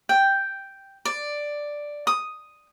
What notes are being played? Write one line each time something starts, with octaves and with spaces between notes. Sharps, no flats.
G5
D5
D#6